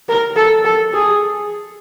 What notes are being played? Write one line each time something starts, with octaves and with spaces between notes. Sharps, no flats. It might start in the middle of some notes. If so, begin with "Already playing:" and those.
A#4
A4
A4
G#4